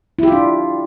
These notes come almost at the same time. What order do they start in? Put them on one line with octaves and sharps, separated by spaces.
E4 G4 F4 D4